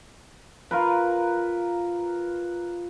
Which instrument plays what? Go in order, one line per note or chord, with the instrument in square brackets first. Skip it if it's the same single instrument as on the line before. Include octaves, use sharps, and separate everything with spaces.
[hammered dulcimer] F4 A#4 B4